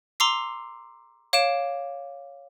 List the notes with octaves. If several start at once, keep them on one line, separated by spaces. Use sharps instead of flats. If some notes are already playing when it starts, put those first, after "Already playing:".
A#5 C6 D6 E6 C7
C#5 F5 D6 D7 E7